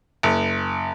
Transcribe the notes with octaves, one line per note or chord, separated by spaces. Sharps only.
F#1